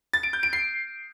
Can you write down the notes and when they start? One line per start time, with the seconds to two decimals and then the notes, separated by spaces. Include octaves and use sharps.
0.13 A6
0.23 D7
0.33 G6
0.43 D7
0.53 C7